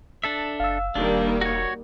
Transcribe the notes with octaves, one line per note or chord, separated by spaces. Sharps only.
D4 A4 E5
F#1 F5 E6
E1 D#3 G3 A#3 D4
F#4 C#5